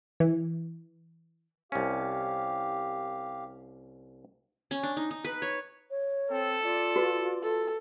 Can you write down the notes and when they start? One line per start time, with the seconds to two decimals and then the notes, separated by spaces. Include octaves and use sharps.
0.20 E3
1.72 C2 C#4 G4 F5
4.71 C#4
4.83 D4
4.97 D#4
5.11 D#4
5.24 B4
5.42 C#5
5.90 C#5
6.30 C4 A4
6.63 F4 D5
6.96 F#4 B4
7.43 A4